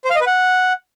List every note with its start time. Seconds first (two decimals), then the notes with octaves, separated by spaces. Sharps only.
0.05 C5
0.10 F5
0.16 D#5
0.21 B4
0.27 F#5